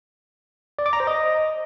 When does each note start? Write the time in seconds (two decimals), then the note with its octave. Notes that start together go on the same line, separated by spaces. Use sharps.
0.79 D5
0.86 D6
0.93 A#5
1.00 C5
1.07 D#5